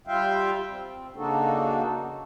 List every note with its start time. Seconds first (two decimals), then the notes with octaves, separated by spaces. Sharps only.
0.07 G3 F4 E5 F5 G5
0.69 C4
1.16 C#3 A#3 D4 D#4 F#4 A4